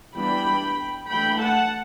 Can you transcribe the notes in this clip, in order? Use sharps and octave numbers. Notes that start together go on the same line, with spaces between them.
E3 G3 B3 D4 G5 B5
E3 A3 D4 G5 B5
F#5 A5